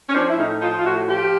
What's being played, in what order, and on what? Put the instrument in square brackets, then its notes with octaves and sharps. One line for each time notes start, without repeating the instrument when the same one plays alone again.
[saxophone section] C#4
F3 C4 D4
E4
A2 C#4 D#4
F3 D#4 F4
F4
A2 E4 F#4
F3 F4 G4